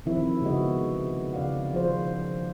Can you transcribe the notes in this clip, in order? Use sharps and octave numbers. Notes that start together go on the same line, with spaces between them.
C3 D#3 F3 C4 E4 E5
C#3 G#3 B3 F#4 D#5
C#3 D5 F5 F#5
D#3 F3 F4 G#4 C5